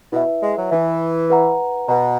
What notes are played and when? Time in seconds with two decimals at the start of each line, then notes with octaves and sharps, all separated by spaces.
0.12 B2 E4 B4 E5
0.42 G#3
0.57 F#3
0.71 E3 E4 B4 E5
1.30 B4 F#5 A#5
1.89 B2 B4 F#5 A#5